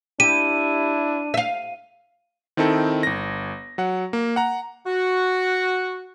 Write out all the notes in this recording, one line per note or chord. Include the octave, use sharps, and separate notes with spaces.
D4 E4 G4 D#7
E5 F5
D#3 C4 D#4 E4 A4
G1 A#6
F#3 F#5
A#3
F#5 A#5
F#4